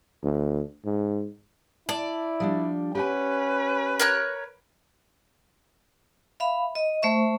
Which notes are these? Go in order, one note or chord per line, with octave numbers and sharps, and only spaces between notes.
D2
G#2
E4 D5 A5
F3 G3 D4
C#4 G4 B4 F#5 G#5
A#4 C#5 F#6
E5 F5 B5
D#5
A3 C5 E5 C#6